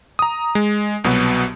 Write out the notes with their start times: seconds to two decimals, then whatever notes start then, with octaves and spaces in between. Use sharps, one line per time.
0.19 A#5 D#6
0.55 G#3
1.04 C2 B2 F#3 B3